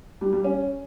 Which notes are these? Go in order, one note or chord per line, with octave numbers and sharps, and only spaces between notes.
G3
G3
C#4